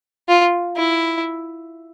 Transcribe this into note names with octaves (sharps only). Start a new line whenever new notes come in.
F4
E4